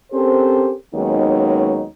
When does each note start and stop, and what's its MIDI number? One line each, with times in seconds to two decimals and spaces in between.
0.12 0.72 60
0.12 0.72 61
0.12 0.72 67
0.12 0.72 69
0.12 0.72 70
0.12 0.72 72
0.95 1.85 39
0.95 1.85 54
0.95 1.85 56
0.95 1.85 59
0.95 1.85 61
0.95 1.85 63